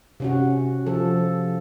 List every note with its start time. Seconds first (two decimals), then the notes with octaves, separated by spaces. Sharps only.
0.20 C3 C#4 F#4
0.86 F3 A4